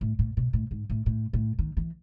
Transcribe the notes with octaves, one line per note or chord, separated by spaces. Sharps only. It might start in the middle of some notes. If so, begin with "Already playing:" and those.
A2
A2
B2
A2
G#2
A2
A2
A2
D#3
E3